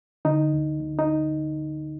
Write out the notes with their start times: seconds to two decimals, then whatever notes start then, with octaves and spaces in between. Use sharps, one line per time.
0.25 D3 D#4
0.53 D2
0.79 D2
0.99 D#4